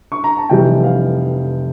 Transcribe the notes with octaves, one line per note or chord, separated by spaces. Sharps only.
C#6
A#5
A5
F1 F2 E3 G3 G5
F5